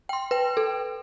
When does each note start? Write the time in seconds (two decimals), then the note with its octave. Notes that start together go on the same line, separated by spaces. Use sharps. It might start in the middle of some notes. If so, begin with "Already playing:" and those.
0.09 G5 C6
0.31 B4 G5
0.57 A4